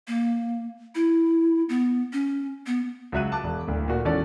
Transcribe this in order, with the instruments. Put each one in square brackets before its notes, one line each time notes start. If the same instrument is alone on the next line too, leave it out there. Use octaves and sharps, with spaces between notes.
[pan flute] A#3
E4
B3
C#4
B3
[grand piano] C#2 F#3 E5 F#6 D#7
A5 D6 F#6
E1
D1 D2
A#2 F#4
G#1 E2 C#4 A4 D5